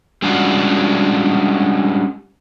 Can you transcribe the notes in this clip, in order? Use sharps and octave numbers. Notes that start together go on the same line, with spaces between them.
G3 G#3 C#4 D4 F4 F#4